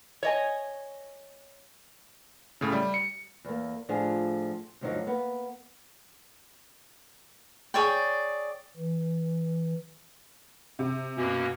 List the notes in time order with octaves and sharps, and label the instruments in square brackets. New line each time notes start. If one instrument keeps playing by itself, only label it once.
[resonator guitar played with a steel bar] C#5 D#5 G#5
[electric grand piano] A2 C#3
G3
C#7
[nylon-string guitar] E2 A#3
A2 F3 D4 F4 G#4
D2 G2 F3 F#3 D#4 A#4
A#3 B3
[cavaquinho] G#4 C#5 D5 G5
[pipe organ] E3
[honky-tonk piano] C3
[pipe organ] F#2 A#3 C#4 [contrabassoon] B2